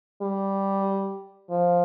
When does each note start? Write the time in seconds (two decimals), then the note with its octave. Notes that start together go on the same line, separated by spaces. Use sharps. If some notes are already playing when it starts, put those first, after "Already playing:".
0.22 G3
1.50 F3